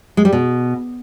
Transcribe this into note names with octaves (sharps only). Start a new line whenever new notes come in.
G#3
G3
B2